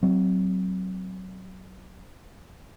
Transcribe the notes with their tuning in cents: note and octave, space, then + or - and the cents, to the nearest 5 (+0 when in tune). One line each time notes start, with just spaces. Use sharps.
F#3 +15 C4 +0